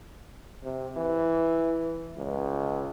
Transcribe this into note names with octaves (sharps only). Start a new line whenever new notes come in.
C3
E3
C#2